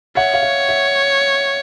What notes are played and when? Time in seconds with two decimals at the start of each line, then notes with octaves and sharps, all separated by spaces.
0.17 C#5 E5 F#5
0.34 F5
0.43 E5
0.69 E5